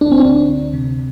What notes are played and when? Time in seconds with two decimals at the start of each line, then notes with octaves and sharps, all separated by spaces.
0.01 D2 D4
0.11 C4
0.20 D4
0.25 D2
0.49 D2
0.73 C3